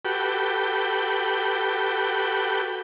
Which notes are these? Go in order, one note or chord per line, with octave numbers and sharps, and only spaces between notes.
F#4 G4 A4 B4 G5